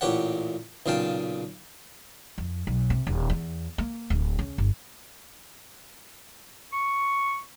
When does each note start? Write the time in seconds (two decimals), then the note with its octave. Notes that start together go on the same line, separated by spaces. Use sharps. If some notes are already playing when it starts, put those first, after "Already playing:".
0.01 A1 A#2 G4 C#5 F#5
0.86 B1 A#2 C#3 F5 G5 A5
2.38 F2
2.67 B1
2.90 C3
3.07 D#1
3.30 E2
3.78 A#3
4.10 D1
4.39 C#3
4.58 G1
6.72 C#6